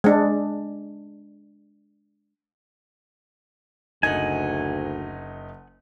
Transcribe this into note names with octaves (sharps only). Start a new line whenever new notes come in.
G#3 D4
F#1 D2 D#4 F#5 G#5